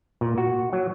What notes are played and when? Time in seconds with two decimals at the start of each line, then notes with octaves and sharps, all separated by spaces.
0.21 A#2
0.38 F#4
0.73 F#3